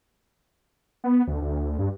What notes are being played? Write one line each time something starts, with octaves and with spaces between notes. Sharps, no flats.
B3
D2
D2
G2